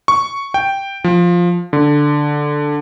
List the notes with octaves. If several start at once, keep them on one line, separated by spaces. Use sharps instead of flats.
C#6
G5
F3
D3